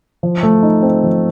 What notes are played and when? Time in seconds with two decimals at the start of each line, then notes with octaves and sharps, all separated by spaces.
0.23 F3
0.43 A3
0.63 D#4
0.83 C4
1.04 F3